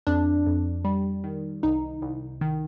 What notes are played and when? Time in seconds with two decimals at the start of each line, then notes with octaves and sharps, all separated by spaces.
0.07 F2 D4
0.46 F2
0.85 G3
1.24 D#3
1.63 C2 D#4
2.02 C2
2.41 D#3